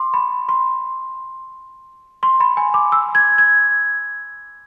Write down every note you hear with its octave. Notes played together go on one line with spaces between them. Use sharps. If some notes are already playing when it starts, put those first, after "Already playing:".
Already playing: C6 D6
B5
C6
C6
B5
G#5
D6
E6
G#6
G#6